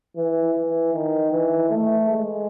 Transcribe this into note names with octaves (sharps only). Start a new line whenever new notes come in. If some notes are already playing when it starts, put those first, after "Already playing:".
E3
E3
D#3
E3
A3
G#3